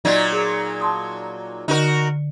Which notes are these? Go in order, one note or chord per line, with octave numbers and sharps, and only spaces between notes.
A#2 F#3 D#4 D5
G#4
A5 C6 D#6
D3 D#4 F#4 A#4